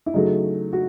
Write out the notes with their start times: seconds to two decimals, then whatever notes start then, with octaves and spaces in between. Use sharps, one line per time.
0.06 E4
0.14 C#3 F#3 A3 D#4
0.73 F#4